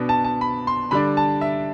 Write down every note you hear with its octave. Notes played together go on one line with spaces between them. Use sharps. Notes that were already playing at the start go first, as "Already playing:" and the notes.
Already playing: B2 B3 D4
A5
A5
B5
C6
D3 G3 D4 B5
A5
E5